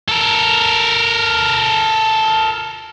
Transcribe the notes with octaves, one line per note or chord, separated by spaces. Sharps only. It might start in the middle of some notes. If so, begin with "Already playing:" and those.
A4 A#4